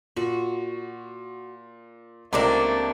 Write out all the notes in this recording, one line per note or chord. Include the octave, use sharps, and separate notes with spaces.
A#2 F#4
C#2 C3 A3 A#3 C4 D4 A#4 D6